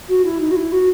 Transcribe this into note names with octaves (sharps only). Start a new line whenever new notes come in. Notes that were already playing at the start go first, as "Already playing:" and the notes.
F#4
E4
D#4
F#4
E4
F#4